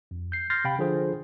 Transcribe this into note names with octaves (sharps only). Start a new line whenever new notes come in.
F2
G6 C7
C6 F6 G6 A6 A#6 C7
C3 F5 G5 B5
D3 F3 F4 G#4 C5